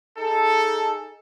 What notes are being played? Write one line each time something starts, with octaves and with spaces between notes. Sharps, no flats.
D#4 G#4 A4